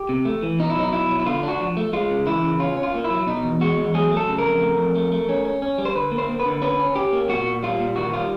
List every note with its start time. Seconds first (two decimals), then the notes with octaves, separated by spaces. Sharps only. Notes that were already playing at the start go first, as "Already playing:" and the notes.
Already playing: G4
0.09 C3
0.25 A3
0.43 E3
0.59 B2 D#4
0.70 E4
0.75 F#3 D#4
0.93 B2 E4
1.09 F#3
1.20 E4
1.26 D3 F4
1.43 D4
1.48 F#4
1.60 F3
1.77 A3
1.93 G#3 F4
2.10 C#3
2.27 E3 E4
2.43 C#3
2.60 C#4 F4
2.77 C#4
2.83 F4
2.94 A#3
3.04 E4
3.10 F#3
3.27 B2 D#4
3.43 E2
3.61 G#3 F#4
3.78 E2
3.94 F#3 G#4
4.11 A3
4.17 A4
4.28 C#3
4.38 A#4
4.45 F2
4.61 A3
4.78 F2
4.95 A3
5.12 A3
5.29 C#4
5.45 C#4
5.62 C#4
5.78 G3
5.85 C5
5.95 D3 B4
6.12 A#3
6.18 C5
6.29 A#3
6.40 B4
6.45 D3
6.62 C#4 B4
6.80 C#4
6.96 C#4 G4
7.13 A#3
7.29 A#2 F#4
7.45 A#2
7.63 G3 F4
7.80 A#2
7.96 D#3 F#4
8.13 G3 F4